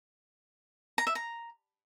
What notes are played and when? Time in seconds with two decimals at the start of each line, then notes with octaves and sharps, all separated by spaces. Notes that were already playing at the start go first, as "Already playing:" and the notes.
0.98 A#5
1.07 E5
1.15 A#5